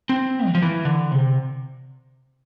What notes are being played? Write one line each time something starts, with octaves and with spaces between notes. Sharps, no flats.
C4
E3
F3
E3
D3
C3